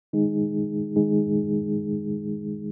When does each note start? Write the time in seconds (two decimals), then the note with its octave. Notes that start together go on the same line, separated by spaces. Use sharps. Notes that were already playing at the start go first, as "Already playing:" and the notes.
0.13 D#3 G#3 D#4 G#4
0.96 D#3 G#3 D#4 G#4